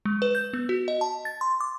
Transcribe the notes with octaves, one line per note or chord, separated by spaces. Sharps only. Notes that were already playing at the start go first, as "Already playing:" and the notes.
G#3
B4
G6
B3
F#4
D#5
A5
A6
C6
D6